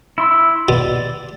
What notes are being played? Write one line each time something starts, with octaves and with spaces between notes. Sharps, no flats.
E4 C6 E6
B2 D5